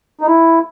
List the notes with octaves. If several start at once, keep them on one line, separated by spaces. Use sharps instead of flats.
D#4
E4